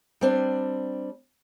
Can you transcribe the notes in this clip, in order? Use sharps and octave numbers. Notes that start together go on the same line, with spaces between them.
G3 C4 D4